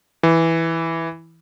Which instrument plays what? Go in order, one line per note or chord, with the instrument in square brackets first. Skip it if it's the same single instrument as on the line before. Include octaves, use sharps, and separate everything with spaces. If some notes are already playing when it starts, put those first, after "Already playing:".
[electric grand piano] E3